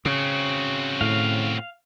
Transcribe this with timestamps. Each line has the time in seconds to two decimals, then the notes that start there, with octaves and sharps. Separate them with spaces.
0.05 C#3 C4 F#4
1.01 A2 F5